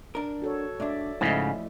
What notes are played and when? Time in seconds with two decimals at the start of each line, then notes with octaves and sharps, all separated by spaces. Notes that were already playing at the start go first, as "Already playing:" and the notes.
0.15 D4 A#4
0.42 F#4 A4 C#5
0.80 G#2 D4 D5 E5
1.21 G#2 C#3 F3 A3 E4 C5 D#5